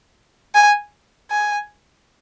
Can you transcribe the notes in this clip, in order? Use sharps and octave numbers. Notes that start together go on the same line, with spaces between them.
G#5
G#5